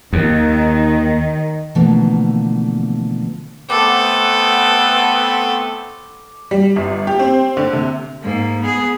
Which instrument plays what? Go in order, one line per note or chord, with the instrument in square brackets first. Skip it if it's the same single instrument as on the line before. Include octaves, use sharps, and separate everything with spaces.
[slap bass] D#2 [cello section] D#3
[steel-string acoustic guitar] B2 D3 E3 F3 A3 A#3
[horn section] A3 B3 C4 [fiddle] A4 [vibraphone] D6
[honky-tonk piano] G3
G1
G4
C4
D3
C3
[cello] G#2 A#3
B3 G#4